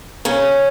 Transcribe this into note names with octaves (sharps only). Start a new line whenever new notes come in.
C#3 C#4